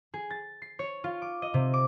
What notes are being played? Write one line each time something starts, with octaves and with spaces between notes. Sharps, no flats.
G#4
A6
C7
C#5
F4
D6
D#5
C3
D6